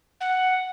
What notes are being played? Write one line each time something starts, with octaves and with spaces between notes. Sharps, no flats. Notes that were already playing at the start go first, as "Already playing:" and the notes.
F#5